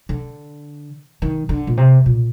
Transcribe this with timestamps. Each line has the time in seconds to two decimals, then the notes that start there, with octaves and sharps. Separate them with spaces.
0.09 D3
1.22 D#3
1.49 D3
1.67 A#2
1.77 C3
2.06 A#2